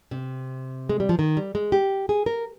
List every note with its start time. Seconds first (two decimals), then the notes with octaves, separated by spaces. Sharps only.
0.11 C3
0.89 G#3
1.00 G3
1.09 F3
1.19 D#3
1.37 G3
1.55 G#3
1.72 G4
2.09 G#4
2.26 A#4